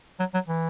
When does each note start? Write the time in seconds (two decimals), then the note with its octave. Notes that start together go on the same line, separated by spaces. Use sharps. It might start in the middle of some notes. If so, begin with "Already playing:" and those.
0.19 F#3
0.34 F#3
0.48 E3